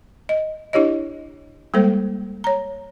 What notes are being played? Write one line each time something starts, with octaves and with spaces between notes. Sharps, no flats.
D#5
D4 E4 G4 C#5 D#5
G3 G#3 A#3 A4 C5
C#5 A#5